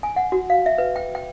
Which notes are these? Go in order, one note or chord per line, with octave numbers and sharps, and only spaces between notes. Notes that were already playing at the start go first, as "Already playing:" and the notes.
G#5
F#5
F#4
F5
E5
B4
G5
G5